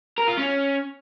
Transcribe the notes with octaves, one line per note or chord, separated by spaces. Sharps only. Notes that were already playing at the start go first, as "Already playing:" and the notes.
A#4
F4
C#4